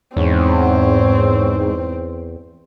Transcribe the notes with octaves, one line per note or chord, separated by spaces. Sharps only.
E2 G#2 C4 C#5